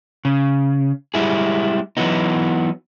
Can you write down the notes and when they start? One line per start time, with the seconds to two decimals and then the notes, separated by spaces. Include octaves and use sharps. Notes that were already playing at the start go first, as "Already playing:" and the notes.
0.25 C#3
1.14 G3 G#3 E4 G#4
1.97 E3 F#3 B3 D#4